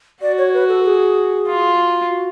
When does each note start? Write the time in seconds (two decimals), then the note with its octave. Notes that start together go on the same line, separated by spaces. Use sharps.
0.22 F#4 D5
0.38 C#5
0.54 B4
0.69 A4
0.85 G#4
1.47 F4
2.10 F#4